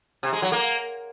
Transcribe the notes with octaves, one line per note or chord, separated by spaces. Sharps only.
C3
G#3
F#3
A#3